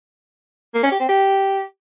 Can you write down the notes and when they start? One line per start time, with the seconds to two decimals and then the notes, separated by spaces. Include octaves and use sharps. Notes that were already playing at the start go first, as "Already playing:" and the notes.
0.74 A#3
0.83 C#4
0.91 G4
1.00 C4
1.09 G4